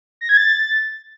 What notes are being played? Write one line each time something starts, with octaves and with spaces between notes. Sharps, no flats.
A#6
G#6
A6